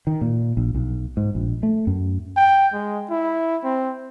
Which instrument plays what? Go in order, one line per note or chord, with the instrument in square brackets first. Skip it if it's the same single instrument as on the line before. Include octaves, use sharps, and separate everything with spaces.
[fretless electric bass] D#3
A#2
A#1
B1
G#2
A#1
A3
F#2
[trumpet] G5
G#3
E4
C4